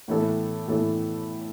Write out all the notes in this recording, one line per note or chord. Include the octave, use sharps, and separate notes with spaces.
A2 E3 B3 E4 A4
A2 E3 B3 E4 A4